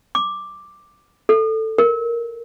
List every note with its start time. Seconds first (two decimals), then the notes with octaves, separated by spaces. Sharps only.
0.15 D6
1.29 A4
1.78 A#4